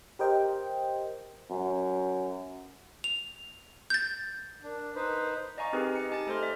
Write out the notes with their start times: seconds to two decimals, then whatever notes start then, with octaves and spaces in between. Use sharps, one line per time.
0.19 G4 A#4 C5 D#5 G5
1.50 F#2
3.04 F7
3.90 G6 A6
4.64 D4 A#4
4.95 D#4 B4 C5
5.58 D5 D#5 F5 G#5 A#5 C#6
5.73 C4 D#4 G4 G#4 A#4 B4
5.95 D#5 C#7
6.10 D#4 G4 G#5 A5 A6
6.27 A3 A4 C5 D#5 C6 F6
6.41 C5 D5 E5